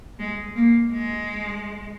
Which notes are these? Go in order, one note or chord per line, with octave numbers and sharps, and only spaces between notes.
G#3
A#3
G#3